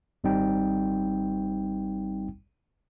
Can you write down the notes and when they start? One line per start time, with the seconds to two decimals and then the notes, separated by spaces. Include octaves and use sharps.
0.24 G#1 G3 C4 D#4 G5